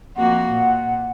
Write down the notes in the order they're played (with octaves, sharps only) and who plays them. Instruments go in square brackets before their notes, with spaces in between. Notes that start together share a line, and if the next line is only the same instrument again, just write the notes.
[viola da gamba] F2 A#3 F#4 [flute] F#5
[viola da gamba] A#2